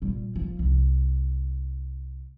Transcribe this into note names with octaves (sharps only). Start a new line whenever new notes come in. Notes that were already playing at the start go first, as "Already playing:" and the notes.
A#2 G3
F3
C2